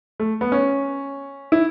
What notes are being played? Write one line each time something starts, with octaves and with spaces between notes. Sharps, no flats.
A3
B3
C#4
E4